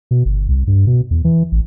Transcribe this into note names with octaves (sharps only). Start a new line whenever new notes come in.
B2
G1
C2
G2
B2
E2
E3
A1